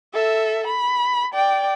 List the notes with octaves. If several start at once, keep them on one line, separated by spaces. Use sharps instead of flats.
A4 E5
B5
D5 G5